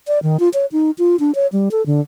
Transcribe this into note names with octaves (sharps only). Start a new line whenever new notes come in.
D5
D#3
F4
C#5
D#4
F4
D4
C#5
G3
A4
D3